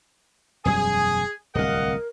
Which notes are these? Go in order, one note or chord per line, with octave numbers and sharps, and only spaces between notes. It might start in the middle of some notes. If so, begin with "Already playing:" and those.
E1 F#2 G3 G#4 G#5
D1 C2 A#4 D#5 F5 F#5